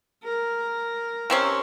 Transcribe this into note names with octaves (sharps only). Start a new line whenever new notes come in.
A#4
C3 C4 C#4